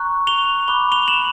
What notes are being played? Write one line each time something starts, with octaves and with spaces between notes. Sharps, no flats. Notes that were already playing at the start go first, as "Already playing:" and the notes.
Already playing: A#5 C#6 F#6
F7 G7
B5 D6 F#6 G7
F7 G7
E7 F#7